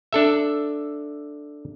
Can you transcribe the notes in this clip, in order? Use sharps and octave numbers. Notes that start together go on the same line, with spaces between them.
D4 A4 E5